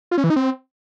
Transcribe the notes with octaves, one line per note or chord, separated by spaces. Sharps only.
F4
C#4
E3
D#4
C4